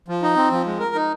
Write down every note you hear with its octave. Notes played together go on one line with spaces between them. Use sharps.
F3
D#4
C4
F3
G#3
A#4
D#4